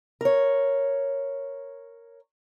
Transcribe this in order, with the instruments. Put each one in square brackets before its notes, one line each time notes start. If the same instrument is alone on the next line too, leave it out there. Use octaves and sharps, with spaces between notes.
[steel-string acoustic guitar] A#4 C#5